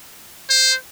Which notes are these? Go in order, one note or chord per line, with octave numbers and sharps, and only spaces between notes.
C5